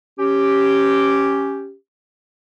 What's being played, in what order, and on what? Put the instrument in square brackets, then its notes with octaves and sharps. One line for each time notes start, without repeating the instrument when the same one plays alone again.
[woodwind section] C#4 G4